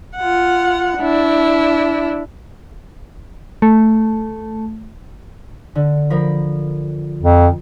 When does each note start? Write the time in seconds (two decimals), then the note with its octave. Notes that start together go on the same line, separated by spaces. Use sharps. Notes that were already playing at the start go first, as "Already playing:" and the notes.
0.17 F4 F#5
0.99 D4 E4
3.62 A3
5.75 D3
6.10 F3 A#4 B5
7.23 F2